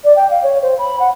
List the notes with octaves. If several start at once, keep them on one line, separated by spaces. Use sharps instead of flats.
D5
G5
F5
C#5
C5
B5
F#5